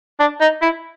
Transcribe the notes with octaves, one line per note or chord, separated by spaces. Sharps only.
D4
D#4
E4